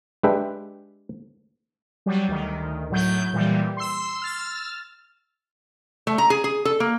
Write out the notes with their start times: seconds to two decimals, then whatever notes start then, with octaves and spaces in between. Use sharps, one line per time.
0.23 G#3 D4 G4 B4 E5 G5
2.06 F#3 G3
2.28 D2 D#3
2.90 A2 F#3 G6
3.33 A#2 E3 G3
3.77 C6 E6
4.20 E6 F6 A6
6.07 A3
6.18 A#5
6.30 G#4
6.44 G#4
6.65 A4
6.80 A#3